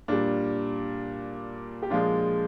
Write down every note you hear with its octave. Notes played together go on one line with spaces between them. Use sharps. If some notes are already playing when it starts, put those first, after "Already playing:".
A#2 G3 D4
G4
A#2 F3 G#3 D4 F4